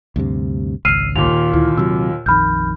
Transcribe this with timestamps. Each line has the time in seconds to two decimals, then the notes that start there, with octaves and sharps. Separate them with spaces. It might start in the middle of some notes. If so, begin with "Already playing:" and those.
0.16 D2 G2 C3
0.85 G#1 C#2 E6 F6 C7 D#7
1.16 D#2 A#2 F7
1.54 D2 E4
1.77 C3 F#3 E6
2.26 A#1 F2 D#3 B5 F6 G6